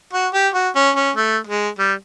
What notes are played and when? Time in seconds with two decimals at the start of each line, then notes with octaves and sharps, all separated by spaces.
0.13 F#4
0.34 G4
0.54 F#4
0.76 C#4
0.96 C#4
1.16 A3
1.47 G#3
1.79 G3